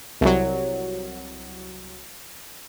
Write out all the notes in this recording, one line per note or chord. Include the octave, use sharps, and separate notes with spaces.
C2 F#3